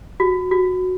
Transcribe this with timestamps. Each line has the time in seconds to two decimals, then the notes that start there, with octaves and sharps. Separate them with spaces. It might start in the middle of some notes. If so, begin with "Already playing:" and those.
0.20 F#4
0.51 F#4